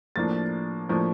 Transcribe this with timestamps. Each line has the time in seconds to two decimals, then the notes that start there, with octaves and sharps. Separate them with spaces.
0.16 A2 F3 A#3 D4 A6
0.89 A2 F3 A#3 D4